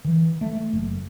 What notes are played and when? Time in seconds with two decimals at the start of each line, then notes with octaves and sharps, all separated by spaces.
0.05 E3
0.41 A3
0.73 F#1